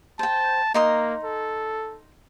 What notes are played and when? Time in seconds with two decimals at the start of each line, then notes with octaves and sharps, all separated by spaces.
0.19 C5 G5 A5
0.74 A#3 D#4 C6 D#6
1.24 A4